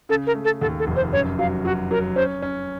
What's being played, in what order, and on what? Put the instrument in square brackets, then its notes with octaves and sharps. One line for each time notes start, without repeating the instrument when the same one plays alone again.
[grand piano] C#3 [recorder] A4
[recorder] A#4
[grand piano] A3
[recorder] A4
[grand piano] D#2 [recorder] A4
[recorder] A4
[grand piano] F1
[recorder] C5
[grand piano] F#2 [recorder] C#5
[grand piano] F#3 [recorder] F5
[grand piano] F#3 [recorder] F#4
[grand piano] F#3 [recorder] A#4
[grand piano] C#4 [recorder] C5
[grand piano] C#4